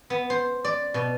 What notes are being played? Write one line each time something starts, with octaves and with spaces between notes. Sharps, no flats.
B3
C5
D5
B2